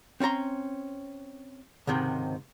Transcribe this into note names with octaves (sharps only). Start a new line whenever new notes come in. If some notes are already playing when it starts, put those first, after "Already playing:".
C4 C#4 E4 A#5 C6
C#2 G#2 C3 D#3